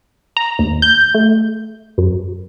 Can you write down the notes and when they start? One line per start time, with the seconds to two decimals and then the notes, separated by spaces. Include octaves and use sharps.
0.37 A#5
0.59 D#2
0.82 G6
1.14 A3
1.98 F#2